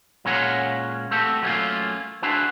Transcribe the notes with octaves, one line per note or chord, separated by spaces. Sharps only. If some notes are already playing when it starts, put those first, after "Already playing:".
A#2 G#3 C#4 A#4 C#5 F#5
A3 C4 F#4 G4 A4
F#3 A3 A#3 C4 C#4 F4
D4 E4 F#4 G#4 B4 C5